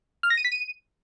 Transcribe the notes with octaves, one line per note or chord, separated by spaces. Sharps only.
F6
A#6
D#7
B6
D#7